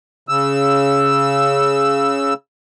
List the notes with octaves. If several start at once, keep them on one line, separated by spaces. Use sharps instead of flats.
C#3 E6